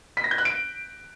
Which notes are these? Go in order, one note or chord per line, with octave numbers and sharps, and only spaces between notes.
B6
A#6
G6
F#6
D7